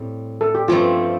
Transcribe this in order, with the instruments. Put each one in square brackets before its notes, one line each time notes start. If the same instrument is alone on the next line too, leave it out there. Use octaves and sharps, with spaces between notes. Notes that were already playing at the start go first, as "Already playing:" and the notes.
Already playing: [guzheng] A2 G3 C4
[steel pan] A4
G4
[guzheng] G2 F3 A3 C4 [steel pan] F4